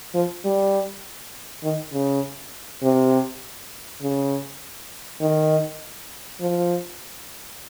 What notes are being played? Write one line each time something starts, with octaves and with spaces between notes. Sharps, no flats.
F3
G3
D#3
C#3
C3
C#3
D#3
F3